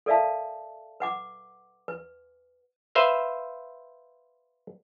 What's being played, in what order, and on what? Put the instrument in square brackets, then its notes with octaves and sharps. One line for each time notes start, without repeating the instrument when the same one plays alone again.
[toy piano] A4 A#4 D5 E5 F5 A5
B4 F#5 D6
B4
[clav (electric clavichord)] B4 C5 E5 F5